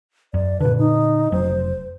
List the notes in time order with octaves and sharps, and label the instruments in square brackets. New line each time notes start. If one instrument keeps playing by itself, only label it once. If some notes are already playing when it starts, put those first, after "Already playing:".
[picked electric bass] F#2 [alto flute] D5
[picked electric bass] A#2 D3 [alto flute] B4
[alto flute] D#4
[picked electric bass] F1 F#3 [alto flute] C5